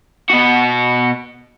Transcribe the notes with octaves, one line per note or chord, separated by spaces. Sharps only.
B2 F#4